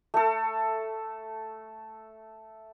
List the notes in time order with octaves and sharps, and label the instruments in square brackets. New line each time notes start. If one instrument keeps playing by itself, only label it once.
[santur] A3 A4